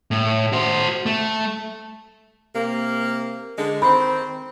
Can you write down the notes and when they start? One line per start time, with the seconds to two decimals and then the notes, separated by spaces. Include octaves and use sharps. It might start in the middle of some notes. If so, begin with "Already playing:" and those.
0.11 A2
0.53 F#4 C5
1.06 A3
2.55 C3 A#3
3.58 D3 G#3
3.82 D#3 C4 B5